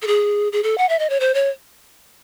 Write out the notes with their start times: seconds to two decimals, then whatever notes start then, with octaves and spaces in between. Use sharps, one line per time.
0.02 A4
0.07 G#4
0.52 G#4
0.63 A4
0.78 F#5
0.89 E5
0.99 D#5
1.10 C#5
1.20 C5
1.34 C#5